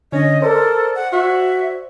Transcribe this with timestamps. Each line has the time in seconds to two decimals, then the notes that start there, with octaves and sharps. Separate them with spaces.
0.12 D3 C#4 D#5
0.42 A4 A#4 C5 D5
0.95 F#5
1.12 F#4 E5